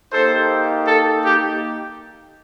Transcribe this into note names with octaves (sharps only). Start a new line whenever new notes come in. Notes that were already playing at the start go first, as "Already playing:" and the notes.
A#3 D#4 G4 A4 C5
A4
G4